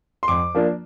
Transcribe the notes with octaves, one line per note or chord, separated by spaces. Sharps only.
C6
F2 D6
F3 A#3 D4